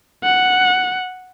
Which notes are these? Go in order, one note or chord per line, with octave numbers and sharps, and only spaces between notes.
F#5